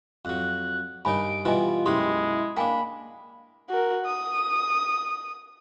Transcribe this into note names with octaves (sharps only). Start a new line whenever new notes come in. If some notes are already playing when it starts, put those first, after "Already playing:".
F2 F#3 F#6
G2 D#3 D#4 C#5 G#5 B5 D7
B2 E3 G3 F4 B4 D#5 G#5
B1 F#2 G#3 E4 G4 C6
A#3 D4 F5 G5 G#5 B5
F#4 A#4
D#6